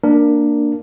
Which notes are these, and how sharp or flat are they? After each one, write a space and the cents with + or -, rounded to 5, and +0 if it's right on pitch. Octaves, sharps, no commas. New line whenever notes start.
A#3 -15 D4 +5 A#4 +0